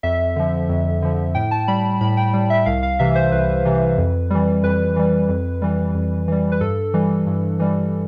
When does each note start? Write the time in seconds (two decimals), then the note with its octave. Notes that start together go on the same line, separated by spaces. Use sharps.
0.03 F2 E5
0.36 D3 F3
0.69 F2
1.02 D3 F3
1.35 A2 G5
1.51 A5
1.68 G3 B5
2.01 A2 B5
2.17 G5
2.33 G3
2.50 E5
2.66 C2 F5
2.83 F5
2.99 C3 E3 E5
3.15 C5
3.32 C2 B4
3.65 C3 E3
3.98 F2
4.30 E3 G3
4.63 F2 B4
4.96 E3 G3
5.29 F2
5.62 E3 G3
5.95 F2
6.28 E3 G3
6.52 B4
6.61 G2 A4
6.94 E3 G3
7.27 G2
7.60 E3 G3